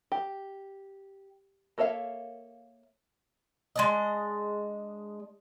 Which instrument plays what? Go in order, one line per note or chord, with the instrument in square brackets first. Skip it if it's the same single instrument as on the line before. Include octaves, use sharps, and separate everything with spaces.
[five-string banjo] G4
A#3 A4 C#5 E5 F5
[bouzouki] G#3 D4 D#5